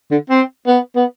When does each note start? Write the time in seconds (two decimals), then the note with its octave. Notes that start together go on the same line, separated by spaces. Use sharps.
0.11 D3
0.30 C4
0.67 B3
0.95 B3